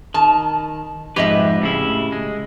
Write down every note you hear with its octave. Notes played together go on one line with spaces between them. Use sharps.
D#3 A5
F2 G#2 G4 B4 D#5 E5
A2 C#3 E4
G#3